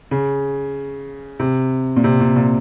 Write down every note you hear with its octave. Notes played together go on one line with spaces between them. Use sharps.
C#3
C3
A#2
C3
A#2
A#2